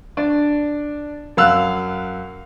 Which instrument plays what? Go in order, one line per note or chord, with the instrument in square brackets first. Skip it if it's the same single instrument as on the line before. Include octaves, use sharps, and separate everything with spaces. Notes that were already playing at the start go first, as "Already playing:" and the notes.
[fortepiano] D4 D5
F#2 F5 E6 F#6